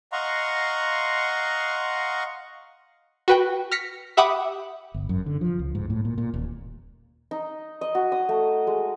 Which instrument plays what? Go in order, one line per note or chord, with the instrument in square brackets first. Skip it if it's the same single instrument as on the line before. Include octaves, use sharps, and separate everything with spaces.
[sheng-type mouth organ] D#5 F5 F#5 A#5 C6 C#6
[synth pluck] F#4 B4 G5
F6 A#6 B6 C#7
G4 E5 F#5 B5 D6 D#6
[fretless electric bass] G1
F#2
D3
F3
C#2
G#2
A2
A#2
A#2
D#1
[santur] D#4
D#5
F#4
D#6
A3
G#3